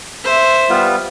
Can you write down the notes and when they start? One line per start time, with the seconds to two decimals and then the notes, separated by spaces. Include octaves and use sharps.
0.25 C5 E5
0.70 G3 B3 F4